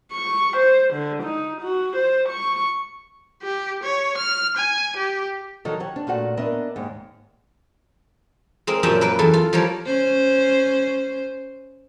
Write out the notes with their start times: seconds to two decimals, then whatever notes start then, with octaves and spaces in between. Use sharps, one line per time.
0.12 C#6
0.57 C5
0.93 D3
1.23 D#4
1.62 F#4
1.96 C5
2.29 C#6
3.43 G4
3.83 C#5
4.17 F6
4.56 G#5
4.96 G4
5.65 D#3 F#3 D#4 A4
5.80 G4 C#5 F#5
5.96 D4
6.07 A#2 A3 F#4 F#5
6.37 B3 D4 A#4 D#5 E5
6.76 D#2 G#2
8.67 G#3 C4 A#4
8.83 F#2 A#2 C4 G4 E5 A5
9.01 A#3 A#4 B4
9.19 E2 A4
9.34 F4
9.53 F3 G3 G4 A#4 C#5
9.86 C#4 C5